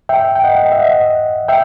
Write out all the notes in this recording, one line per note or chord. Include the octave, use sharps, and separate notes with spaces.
E5 G5
G5
D#5 F#5
E5
D#5 F#5
E5 G5